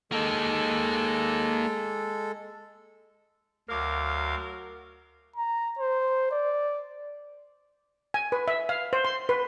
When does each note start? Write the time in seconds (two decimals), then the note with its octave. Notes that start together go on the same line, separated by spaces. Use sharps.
0.12 G#3 A#3 D#4 A4
3.69 D2 F#3 A#4 F5 D6 F6
5.36 A#5
5.79 C5
6.31 D5
8.14 G#5
8.32 B4
8.48 E5
8.69 F5
8.93 C5
9.05 C6
9.29 B4